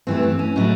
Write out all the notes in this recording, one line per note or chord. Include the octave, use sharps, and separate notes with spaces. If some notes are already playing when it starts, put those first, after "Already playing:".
G2 E3 A3 C4
C4
C#4
A2 F#3 A3 D#4